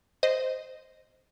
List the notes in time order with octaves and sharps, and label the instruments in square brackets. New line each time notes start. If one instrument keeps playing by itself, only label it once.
[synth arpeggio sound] C5 D#5